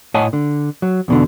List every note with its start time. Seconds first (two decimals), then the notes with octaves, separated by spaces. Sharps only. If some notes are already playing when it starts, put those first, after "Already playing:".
0.14 A2 C#5 D#5 F#5 G#5 A5
0.33 D3
0.82 F#3
1.08 E2 B2 D3